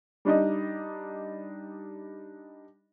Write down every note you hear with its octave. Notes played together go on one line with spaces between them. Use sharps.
G3 D4 D#4 D#5